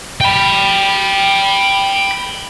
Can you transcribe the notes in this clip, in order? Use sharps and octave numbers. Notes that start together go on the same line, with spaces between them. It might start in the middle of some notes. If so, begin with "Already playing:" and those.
G5 B5